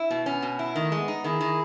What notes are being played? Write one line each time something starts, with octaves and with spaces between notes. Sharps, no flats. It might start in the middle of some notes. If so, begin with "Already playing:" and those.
Already playing: E4
B2
B3 C#4
B2
E4
D#3 A3
G#3
B3
D#4
D#3 E4 G#4
D#3